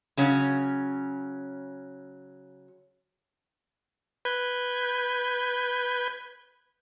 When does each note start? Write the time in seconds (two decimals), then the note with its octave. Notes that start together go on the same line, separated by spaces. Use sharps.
0.17 C#3 F#3 C#4
4.25 B4 G6 G#6